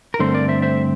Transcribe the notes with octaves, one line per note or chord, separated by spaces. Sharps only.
A#4
G2 D3 A3 C4 A4 C5
A#4 D5
C5 E5
C5 E5